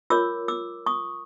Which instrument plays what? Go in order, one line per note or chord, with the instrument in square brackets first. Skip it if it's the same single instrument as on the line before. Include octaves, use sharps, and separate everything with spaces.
[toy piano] F4 A#4 C#5 D6 E6
D6 E6
C#6 D#6